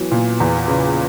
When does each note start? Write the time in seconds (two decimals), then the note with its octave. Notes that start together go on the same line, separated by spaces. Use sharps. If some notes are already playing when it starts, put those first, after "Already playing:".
Already playing: E3 F#3 B3
0.11 A#2
0.40 E2
0.68 C#3